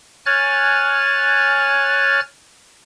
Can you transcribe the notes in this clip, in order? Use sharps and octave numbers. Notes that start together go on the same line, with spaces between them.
C#5 G#5 F6 F#6 A6